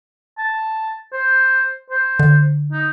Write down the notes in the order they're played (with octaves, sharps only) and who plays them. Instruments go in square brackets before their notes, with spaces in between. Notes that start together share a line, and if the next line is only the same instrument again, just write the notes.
[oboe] A5
C5
C5
[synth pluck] D3
[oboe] D#4